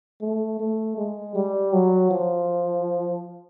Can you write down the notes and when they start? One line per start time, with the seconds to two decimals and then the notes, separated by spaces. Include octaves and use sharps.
0.21 A3
0.59 A3
0.97 G#3
1.35 G3
1.73 F#3
2.11 F3